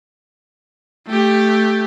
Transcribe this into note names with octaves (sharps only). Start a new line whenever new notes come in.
A3 G4